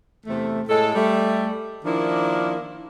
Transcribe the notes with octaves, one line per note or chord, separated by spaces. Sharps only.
E2 C3 A3
A2 G#3 A4
G3 A3
D#3 F3 A#3 D4 E4